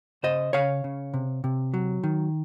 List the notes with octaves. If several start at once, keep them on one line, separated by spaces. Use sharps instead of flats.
C#3 C5 D#5
C#3 C#5 F5
C#3
C3
C3
F#3
D#3